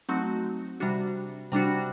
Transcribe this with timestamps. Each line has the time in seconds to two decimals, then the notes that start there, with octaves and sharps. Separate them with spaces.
0.09 F#3 A3 C4 D#4 F#4
0.80 C3 G3 D4 F#4
1.52 C3 G3 D4 F#4